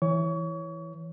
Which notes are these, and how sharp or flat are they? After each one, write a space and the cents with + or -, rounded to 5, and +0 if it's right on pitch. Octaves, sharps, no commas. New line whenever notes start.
E3 +0 C#5 +0 C#6 +35